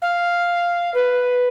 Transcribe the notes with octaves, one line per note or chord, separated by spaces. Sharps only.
F5
B4